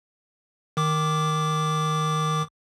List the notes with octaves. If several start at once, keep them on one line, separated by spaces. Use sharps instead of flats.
D#3 D6